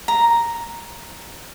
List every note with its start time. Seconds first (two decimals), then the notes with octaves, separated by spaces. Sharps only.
0.08 A#5